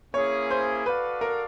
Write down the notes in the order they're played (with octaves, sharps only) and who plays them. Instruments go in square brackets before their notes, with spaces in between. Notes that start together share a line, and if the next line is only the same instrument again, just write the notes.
[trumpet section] A#3 C#4 E4 G#4 [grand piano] C#5
[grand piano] C5
[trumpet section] F#4 A4 D5 F5 [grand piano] B4
[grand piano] A#4